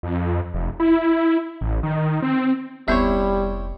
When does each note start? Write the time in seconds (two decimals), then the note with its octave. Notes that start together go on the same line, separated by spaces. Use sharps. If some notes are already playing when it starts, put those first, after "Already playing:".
0.03 F2
0.54 F1
0.80 E4
1.61 A1
1.83 D#3
2.22 C4
2.88 F1 D2 G3 B3 E4 C5 C#5 G6